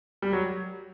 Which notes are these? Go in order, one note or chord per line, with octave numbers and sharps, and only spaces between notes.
G3
F#3